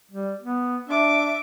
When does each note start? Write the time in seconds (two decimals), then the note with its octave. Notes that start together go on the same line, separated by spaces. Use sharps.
0.11 G3
0.42 B3
0.88 D4 E5 D6